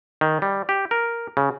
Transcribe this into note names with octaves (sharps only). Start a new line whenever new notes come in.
D#3
G3
G4
A#4
C#3